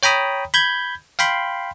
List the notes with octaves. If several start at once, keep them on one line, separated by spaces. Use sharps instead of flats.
C#5 G5 A#5 B5 D#6
B5 G6 G#6
F5 G5 B5 C6